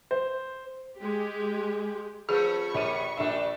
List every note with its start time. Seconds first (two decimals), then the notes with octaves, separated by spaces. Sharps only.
0.11 C5
0.98 G#3 G4
2.29 F3 A3 C#4 G#4 B4 B5 C#6
2.74 A#1 G3 B3 C#5 D#7
3.17 A#1 G3 A3 D4 E5